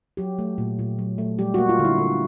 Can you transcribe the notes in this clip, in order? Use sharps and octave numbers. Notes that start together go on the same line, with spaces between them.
F#3 G4
A3
A#2
A#2
F#3
A3
G3 G4
A#3 F#4
F4
D3
E4
D3